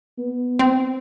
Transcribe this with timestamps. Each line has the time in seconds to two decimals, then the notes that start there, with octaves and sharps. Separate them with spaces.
0.18 B3
0.59 C4